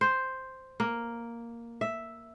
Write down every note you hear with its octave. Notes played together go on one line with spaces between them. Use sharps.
C5
A#3
E5